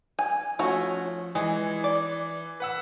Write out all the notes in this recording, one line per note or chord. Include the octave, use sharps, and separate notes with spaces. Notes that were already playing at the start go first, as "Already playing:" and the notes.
G#5
F3 A3 C#4 F#4
E3 G#3
D5
B4 F#5 E6